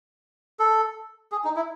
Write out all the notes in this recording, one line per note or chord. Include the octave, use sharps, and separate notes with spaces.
A4
G#4
D#4
E4